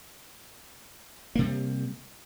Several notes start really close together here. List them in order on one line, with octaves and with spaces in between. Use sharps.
A#3 C3 G3